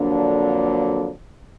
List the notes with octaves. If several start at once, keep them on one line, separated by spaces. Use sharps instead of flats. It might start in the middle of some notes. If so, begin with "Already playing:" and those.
Already playing: F2 D3 F#3 A#3 D4